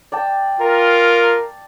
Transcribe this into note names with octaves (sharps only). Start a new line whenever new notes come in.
D5 G5 A5
F4 A#4